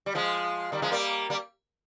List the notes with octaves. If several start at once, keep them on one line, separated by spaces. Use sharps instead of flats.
G3
F3 G#3
D#3 G3
F3 G#3
G3 A#3
G3 A#3